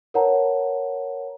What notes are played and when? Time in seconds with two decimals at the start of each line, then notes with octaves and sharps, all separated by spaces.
0.14 A#4 B4 C#5 F#5 A5 A#5